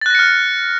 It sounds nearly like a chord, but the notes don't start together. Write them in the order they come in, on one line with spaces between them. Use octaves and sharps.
A6 F#6 A#6 C#7 F6